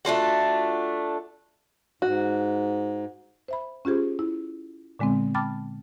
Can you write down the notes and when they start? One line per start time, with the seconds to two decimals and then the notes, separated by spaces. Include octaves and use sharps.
0.05 A3 D4 F4 F#4
2.02 G#2 F#4
3.48 C5 E5 B5
3.85 C#4 F4 G4 G#4 C5
4.19 E4
4.99 A#2 D3 G#3 B3 C4
5.35 G5 A5 B5 D6 F6 A6